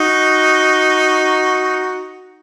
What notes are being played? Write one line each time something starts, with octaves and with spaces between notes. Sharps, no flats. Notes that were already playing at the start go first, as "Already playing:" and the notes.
Already playing: D#4 F#4